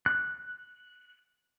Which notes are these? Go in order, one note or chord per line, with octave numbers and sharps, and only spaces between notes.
F#6